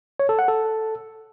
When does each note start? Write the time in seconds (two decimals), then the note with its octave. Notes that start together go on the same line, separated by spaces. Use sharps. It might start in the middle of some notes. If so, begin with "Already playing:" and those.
0.20 C#5
0.29 A4
0.39 F#5
0.48 A4